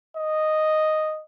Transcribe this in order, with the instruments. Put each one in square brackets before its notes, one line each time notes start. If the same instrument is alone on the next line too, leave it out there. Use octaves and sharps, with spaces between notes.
[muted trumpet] D#5